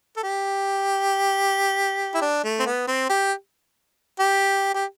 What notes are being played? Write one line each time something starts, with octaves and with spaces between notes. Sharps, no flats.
A4
G4
E4
D4
A3
C4
B3
C4
G4
G4
G4